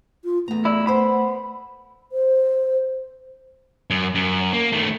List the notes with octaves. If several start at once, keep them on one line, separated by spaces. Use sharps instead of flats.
F4
E2 A3 A#5
E4 D5
B3 C5 B5
C5
F#2
F#2
A#3
D#3 A3